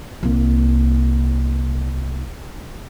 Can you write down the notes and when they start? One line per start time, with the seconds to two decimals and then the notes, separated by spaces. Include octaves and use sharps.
0.23 C2 A#3